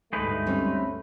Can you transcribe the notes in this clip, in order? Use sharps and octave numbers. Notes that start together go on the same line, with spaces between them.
D2 G2 G#3 A3 D#4 B4
G3 C4 C#4